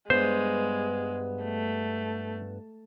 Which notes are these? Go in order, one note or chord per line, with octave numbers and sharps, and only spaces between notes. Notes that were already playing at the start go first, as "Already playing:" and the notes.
G2 G#3 B3 C5
A3